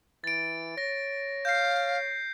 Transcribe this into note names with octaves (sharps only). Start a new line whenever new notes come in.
E3 A6 D7
C#5 A#6
F5 G6 C7